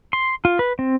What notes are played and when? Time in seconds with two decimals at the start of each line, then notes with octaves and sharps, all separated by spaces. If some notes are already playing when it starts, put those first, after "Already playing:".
0.13 C6
0.45 F4
0.59 B4
0.79 C4